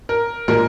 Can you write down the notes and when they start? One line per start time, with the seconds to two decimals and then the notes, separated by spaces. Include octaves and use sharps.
0.09 A#4
0.48 A#2 F3 G#3 A#4